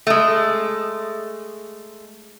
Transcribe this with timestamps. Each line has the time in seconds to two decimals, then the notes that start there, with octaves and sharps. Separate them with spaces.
0.07 G#3 A3